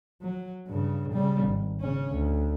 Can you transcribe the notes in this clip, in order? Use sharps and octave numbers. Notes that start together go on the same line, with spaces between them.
F#3
G2 C#3
C#3 G3
G#1
C#3 C#4
D2